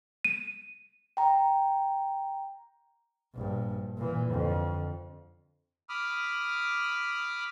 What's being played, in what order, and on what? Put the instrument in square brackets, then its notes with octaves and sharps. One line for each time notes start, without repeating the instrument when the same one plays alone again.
[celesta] D#7
[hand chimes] G5 A#5
[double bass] A#1 G2
A#2 E3
F2 D3
[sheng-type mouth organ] B5 D6 D#6 F6